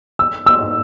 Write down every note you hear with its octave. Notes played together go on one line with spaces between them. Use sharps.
E6
E6